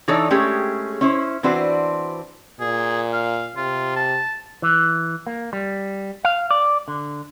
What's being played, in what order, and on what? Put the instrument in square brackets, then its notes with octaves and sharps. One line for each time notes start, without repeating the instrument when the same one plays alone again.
[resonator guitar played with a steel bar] E3 D4 D#4 A4 C#5 D#5
G#3 A3 C#4 G4 G#4
C#4 E4 C5
E3 C4 D4 F#4 B4 C5
[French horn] A#2 [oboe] G#4
[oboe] F5
[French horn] C3 [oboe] F4
[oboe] A5
[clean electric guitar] E3
A#3
G3
F5
D5
D3